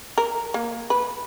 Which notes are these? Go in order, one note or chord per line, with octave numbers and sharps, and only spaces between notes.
A#4
A#3
B4